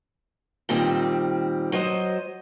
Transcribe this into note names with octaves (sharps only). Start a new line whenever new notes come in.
A#2 D#3 G3 C4
F#3 C5 D#5